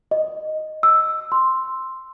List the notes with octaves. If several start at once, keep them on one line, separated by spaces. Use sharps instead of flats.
D#5
E6
C6